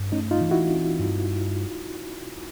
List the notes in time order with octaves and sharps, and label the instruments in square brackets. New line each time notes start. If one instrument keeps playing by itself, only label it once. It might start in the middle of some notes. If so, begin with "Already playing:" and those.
Already playing: [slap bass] G2
[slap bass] A3 [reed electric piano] C#4 D#4
[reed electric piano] D#4 F4
[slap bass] E3
[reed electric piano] E4 F#4
[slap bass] C4
G2